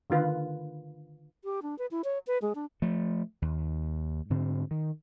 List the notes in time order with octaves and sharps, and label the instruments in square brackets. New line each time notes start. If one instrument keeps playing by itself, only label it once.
[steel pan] D3 D#3 F4 B4
[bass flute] G4
D4
B4
E4
C#5
B4
G#3
D4
[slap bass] F3 A3
D#2
G#2 D3 C4
D#3